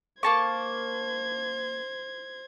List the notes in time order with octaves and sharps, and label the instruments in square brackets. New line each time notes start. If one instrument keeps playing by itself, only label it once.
[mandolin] A#3 A5 C#6 [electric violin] C5 G#6